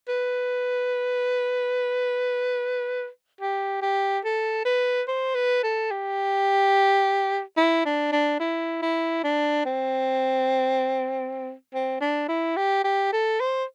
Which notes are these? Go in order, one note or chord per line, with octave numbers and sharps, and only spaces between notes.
B4
G4
G4
A4
B4
C5
B4
A4
G4
E4
D4
D4
E4
E4
D4
C4
C4
D4
E4
G4
G4
A4
C5